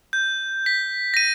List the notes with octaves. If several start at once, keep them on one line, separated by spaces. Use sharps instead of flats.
G6
B6
A#6 D#7